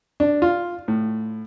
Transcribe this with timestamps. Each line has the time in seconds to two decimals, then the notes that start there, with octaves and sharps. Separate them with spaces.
0.20 D4
0.42 F4
0.88 A2